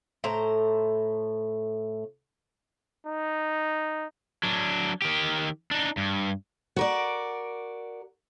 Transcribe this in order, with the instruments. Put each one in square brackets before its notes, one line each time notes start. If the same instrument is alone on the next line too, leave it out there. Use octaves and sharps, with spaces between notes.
[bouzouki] A2 C5 A#5
[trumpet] D#4
[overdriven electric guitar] F#3 D4
D#3 G4
D4 D#4
G2
[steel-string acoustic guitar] F#4 A#4 D5